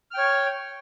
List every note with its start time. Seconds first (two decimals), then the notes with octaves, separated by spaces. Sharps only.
0.11 F6
0.14 G5
0.18 C#5